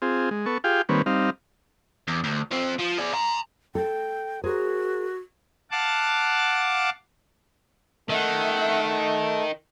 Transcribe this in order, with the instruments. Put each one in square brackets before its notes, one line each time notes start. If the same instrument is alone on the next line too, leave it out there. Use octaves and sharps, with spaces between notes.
[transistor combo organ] C4 F4 G#4
G#3
B3 A4 C#6
F4 G4 G#4 F5 G5
D#3 G3 A#3 C4 B4 C#5
G3 C4 D#4 F5
[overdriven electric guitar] E2
D2
F3 C4
F3
G#4 D5
G#5 A#5
[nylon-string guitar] A4 [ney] G5
[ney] F#4 [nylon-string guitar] G#4 A#4 C5
[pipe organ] F5 F#5 A5 D6
[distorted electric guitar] D#3 [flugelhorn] A3 [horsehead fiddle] E5 F#5